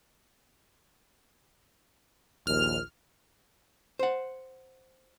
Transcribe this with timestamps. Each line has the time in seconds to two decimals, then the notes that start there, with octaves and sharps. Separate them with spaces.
2.47 A#1 D#2 F6
3.99 C5 F#5